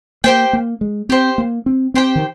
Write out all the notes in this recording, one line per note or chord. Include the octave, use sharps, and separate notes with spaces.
A#3 G4 C5 G5
A#3
G#3
C4 G4 C5 G5
A#3
C4
C4 G4 C5 G5
D#3